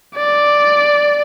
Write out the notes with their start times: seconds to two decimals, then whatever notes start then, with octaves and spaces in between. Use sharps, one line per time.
0.16 D5